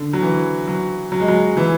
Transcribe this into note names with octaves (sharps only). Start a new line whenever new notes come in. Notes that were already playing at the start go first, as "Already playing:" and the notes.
Already playing: D3
F#3
E3
F#3
F#3
G#3
F#3
E3